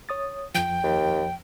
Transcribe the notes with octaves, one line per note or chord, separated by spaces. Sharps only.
C#5 D#6 A6
F2 F3 G5
D#2